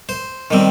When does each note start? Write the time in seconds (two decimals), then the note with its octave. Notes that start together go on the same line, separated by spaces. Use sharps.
0.09 C5
0.51 D#3 G3 C4